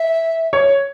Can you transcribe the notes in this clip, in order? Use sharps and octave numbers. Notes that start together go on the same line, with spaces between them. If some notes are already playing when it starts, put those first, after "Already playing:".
Already playing: E5
C#5